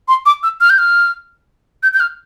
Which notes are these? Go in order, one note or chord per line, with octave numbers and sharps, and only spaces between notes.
C6
D6
E6
F6
G6
F6
G6
G6
F6